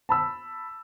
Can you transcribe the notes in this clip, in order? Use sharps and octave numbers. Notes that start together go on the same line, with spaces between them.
A5 B5 E6